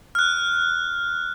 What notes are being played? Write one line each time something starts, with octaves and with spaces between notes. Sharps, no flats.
F6 F#6